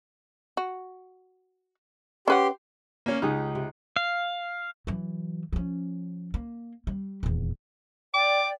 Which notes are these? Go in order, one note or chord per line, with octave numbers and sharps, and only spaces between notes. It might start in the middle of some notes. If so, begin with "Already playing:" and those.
F#4
C#4 G4 B4 F#5 C6
A#3 C#4
C#2 D#4 G4 G#4
C3
F5
E3 F#3
F3 C#4
A#3
G3
D#1 E2
D5 G5 D6